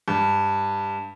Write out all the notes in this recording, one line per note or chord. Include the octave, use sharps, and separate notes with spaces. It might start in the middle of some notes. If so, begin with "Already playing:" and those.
G2